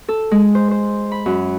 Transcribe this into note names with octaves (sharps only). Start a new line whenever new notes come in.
A4
G#3
C5
C5
B5
F#2